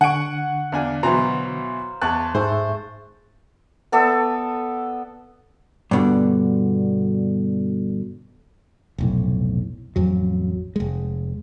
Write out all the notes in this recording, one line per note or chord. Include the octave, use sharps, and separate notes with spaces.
D3 F#5 G#5 C#6 D7
E2 D4 F5 G#5
B2 E3 F#3 C5 A#5
E2 D#5 A5 C#6 F#6
G#2 A3 G#4 A4 C5 E5
B3 A4 D5 E5
G2 B2 D3
F1 B1 A2
A1 F2 F#3
F1 G#3